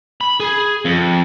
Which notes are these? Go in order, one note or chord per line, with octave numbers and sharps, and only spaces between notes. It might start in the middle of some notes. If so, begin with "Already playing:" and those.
B5
G#4
F2